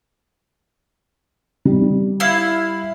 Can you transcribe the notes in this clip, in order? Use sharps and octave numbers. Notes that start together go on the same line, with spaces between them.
G3
E4 F5